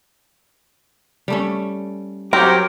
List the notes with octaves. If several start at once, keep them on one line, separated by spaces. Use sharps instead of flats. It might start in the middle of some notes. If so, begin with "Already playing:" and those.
G3 A3 C#4
F#3 C4 G4 A#4